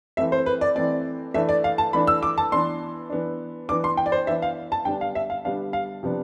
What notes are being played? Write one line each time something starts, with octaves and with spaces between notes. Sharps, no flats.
E3 A3 C4 E5
C5
B4
D5
E3 A3 C4 D5
E3 A3 D4 E5
D5
F5
A5
E3 A3 D4 B5
E6
D6
A5
E3 B3 D4 C6
E3 B3 D4
E3 B3 D4 D6
C6
G5
D5
C5
E3 B3 D4 E5
F5
A5
D3 G3 B3 D4 G5
F5
E5
F5
D3 G3 B3 D4 F5
F5
C3 F3 B3 D4